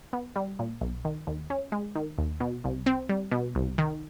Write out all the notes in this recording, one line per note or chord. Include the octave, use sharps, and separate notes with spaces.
B3
G3
A#2
B1
D#3
D#2
C#4
G#3
D#3
D#2
B2
C2
C4
G3
B2
C2
D#3